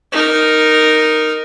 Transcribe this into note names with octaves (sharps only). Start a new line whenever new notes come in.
D#4 A#4